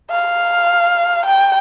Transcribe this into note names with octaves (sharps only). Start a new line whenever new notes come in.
F5
G5